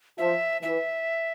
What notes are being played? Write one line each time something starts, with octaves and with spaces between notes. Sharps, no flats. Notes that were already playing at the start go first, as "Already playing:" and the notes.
F3 E5
E3 E5